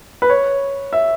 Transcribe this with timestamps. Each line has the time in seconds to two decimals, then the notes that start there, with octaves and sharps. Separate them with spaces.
0.22 B4
0.30 C#5
0.93 E5